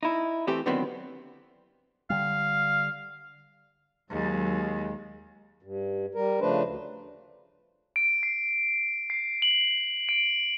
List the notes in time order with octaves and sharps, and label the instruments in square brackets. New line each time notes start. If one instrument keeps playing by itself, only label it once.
[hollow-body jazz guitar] D#4 E4
E3 A3 C4 G4
D3 D#3 F#3 B3 C4 E4
[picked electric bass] D3 G3 [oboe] F5
[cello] D#2 [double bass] F#3 [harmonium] G#3
[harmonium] G2
G3 A#4
C#3 F3 A3 D4 B4 C5
D2
[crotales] D7
C7
C7
F#7
D7